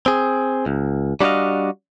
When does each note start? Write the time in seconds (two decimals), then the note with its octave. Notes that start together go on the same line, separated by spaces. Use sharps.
0.06 C4 G#4
0.66 C#2
1.21 G3 D4 F#4 A4 D#5 F5